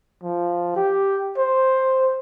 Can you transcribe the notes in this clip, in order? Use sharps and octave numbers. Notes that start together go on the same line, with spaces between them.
F3
G4
C5